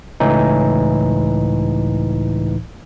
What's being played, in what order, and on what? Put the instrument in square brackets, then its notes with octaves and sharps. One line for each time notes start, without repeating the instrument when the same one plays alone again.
[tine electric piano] C#2 A2 E3 D#4